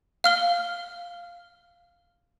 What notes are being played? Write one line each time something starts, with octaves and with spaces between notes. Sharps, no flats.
F5 F6 G7